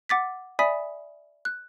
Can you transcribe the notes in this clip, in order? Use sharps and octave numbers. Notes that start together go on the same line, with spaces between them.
F#5 D6 A6 B6
D5 E5 G#5 B5 D#6 B6
F#6